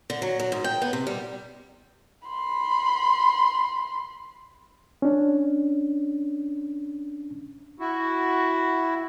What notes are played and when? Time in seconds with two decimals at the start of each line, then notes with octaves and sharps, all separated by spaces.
0.10 D3
0.22 F#3
0.40 F#3
0.52 G#2
0.64 G5
0.82 B3
0.93 C3
1.07 G3
2.27 B5 C6
5.02 C#4 D4
7.79 E4 F#4